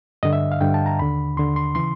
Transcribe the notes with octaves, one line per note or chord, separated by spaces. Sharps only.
G2 D3 D#5
E5
F5
G2 D3 G5
A5
A#5
D#2 D3 B5
D#2 D3 C6
C6
C#3 E3 C6